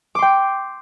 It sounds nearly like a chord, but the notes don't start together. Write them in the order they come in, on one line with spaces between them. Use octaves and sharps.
D6 C6 G5